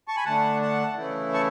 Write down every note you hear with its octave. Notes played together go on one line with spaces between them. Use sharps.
A5 C#6
G#5 B5
D3 A3 D4 F#5 A5
F#5 A5
C#3 E3 A3 E4
A5 C#6